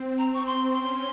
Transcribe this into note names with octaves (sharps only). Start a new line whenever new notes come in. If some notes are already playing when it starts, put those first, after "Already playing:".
Already playing: C4
A#5
C#6
C6
C#4 C6